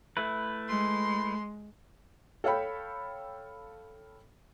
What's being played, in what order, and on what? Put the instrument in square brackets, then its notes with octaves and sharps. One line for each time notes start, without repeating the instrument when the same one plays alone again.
[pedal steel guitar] A3 E4 B4
[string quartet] G#3 [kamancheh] C6
[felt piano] A4 C#5 F5 G5 B5